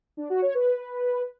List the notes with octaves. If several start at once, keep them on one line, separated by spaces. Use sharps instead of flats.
D4
F#4
C#5
B4